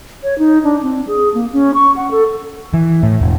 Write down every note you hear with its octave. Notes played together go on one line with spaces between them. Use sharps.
C#5
D#4
D4
C4
G#4
A#3
C#4
C#6
F#5
A4
E3
A2
E1